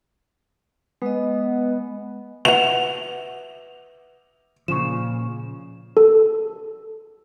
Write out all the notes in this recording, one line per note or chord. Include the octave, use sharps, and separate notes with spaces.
G#3 B3 D#5
F#4 B4 E5 F#5 E7 F7
A#2 C#3 F3 C#6 E7
A4